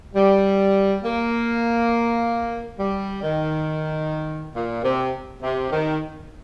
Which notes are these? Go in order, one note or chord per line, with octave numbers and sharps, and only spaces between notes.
G3
A#3
G3
D#3
A#2
C3
C3
D#3